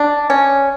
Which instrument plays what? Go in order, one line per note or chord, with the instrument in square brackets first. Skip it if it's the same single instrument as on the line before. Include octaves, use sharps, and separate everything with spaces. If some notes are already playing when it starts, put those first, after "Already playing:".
Already playing: [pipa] D4
C#4